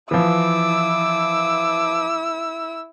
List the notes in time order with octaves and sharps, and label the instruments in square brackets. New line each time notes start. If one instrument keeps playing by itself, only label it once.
[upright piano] E3 F3 [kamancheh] E4 E6 [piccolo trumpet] D6